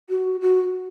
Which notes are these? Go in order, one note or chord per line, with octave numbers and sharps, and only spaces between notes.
F#4
F#4